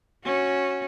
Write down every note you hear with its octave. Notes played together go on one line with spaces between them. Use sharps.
C#4 F#4